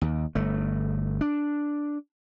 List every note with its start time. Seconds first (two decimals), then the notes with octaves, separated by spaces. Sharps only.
0.01 D#2
0.35 G1 A3
1.21 D4